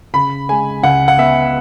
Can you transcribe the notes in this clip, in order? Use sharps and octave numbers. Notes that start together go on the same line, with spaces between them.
C#3 B5
G#3 G#5
C#2 F#5
F#5
B3 E5